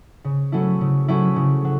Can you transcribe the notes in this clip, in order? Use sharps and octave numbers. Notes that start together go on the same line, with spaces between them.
C#3
F#3 A3 C#4 E4
C#3
F#3 A3 C#4 E4
C#3
F#3